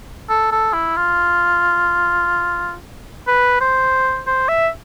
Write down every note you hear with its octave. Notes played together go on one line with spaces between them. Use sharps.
A4
A4
E4
F4
B4
C5
C5
E5